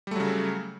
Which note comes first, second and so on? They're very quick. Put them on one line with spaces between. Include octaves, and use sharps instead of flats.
G3 A3 F#3 C#3